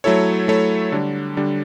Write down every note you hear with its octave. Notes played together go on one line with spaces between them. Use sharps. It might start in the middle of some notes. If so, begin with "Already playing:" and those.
F#3 A3 E4 A4 C#5
F#3 A3 E4 A4 C#5
D3 G3 D4
D3 G3 D4